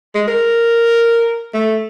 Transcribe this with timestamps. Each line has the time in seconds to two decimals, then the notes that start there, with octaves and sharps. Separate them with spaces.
0.15 G#3
0.28 A#4
1.54 A3